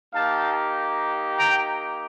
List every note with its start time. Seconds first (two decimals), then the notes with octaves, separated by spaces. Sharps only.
0.14 A#3 D#4 G4 F5 A5
1.38 G5 A#5